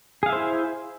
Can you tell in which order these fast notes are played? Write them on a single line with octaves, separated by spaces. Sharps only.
G#4 F5 E5 C5 E4